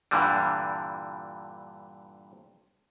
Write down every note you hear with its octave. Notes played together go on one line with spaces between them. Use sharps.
G2 A#2 D3 E3 G3